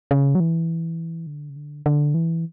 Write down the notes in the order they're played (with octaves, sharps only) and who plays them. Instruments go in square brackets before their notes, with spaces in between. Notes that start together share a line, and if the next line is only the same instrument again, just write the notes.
[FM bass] C#3
F#3
E3
D3
C#3
D3
D3
E3